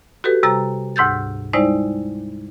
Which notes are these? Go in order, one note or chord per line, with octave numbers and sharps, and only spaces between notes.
F#4 G4 A4 B4
C3 G3 A#5 A6
D2 G#2 E6 G6 A6
G3 G#3 D#4 E4 C5 D5